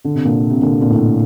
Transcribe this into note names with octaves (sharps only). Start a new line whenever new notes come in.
D3
C3
A#2 D3
C3
A#2 D3
A#2
A2 C3